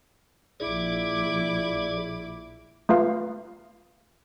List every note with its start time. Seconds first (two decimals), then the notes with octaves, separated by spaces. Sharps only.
0.60 A#1 E4 G#4 D5 D6
2.89 A3 F4 B4 F5